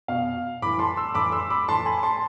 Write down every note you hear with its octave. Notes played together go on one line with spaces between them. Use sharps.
B2 F5
A2 E3 B5 D6
A5 C6
C6 E6
A2 E3 B5 D6
C6 E6
B5 D6
A2 E3 A5 C6
G#5 B5
A5 C6